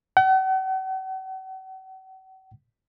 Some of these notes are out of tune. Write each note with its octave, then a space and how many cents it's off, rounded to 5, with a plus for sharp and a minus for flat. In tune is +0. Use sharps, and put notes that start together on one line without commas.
F#5 +45